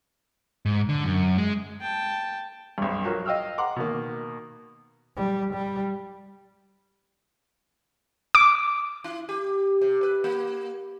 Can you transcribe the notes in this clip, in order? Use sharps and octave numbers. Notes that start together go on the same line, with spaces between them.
G#2
D3
F#2
G#3
G5 A5
B1 G2
F3 F#3 A#4
D#5 F5 G5 E6 F6
F#5 A#5 C6 D6
B2 D#3 A#3
G3
G3
D6
E4
G4
C3
B4
A#3